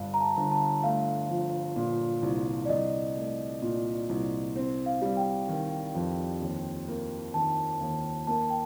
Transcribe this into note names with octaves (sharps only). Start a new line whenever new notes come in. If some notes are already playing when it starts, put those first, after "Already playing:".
Already playing: G1 G2 D3 F5
A#5
A5
G1
A5
A3 F5
F3
A#2
C2
D5
C2 D#5
A3
A#2
C2
C4
F5
G3
G5
D#3
F2
D#2
A#3
D#3 A5
D#2
A#3 A5
G5